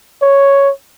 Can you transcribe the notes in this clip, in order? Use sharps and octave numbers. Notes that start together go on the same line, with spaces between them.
C#5